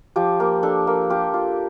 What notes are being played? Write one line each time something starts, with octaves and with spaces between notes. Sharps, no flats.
F3 G4
A#3
D4 A4
A#3
F4 G4
F4